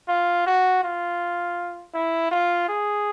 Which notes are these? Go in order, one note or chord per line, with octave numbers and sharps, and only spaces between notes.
F4
F#4
F4
E4
F4
G#4